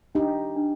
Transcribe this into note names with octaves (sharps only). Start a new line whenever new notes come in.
D4 D#4 G4
D4